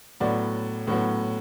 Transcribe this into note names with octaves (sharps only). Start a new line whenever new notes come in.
A2 F#3 B3 D5
A2 F#3 B3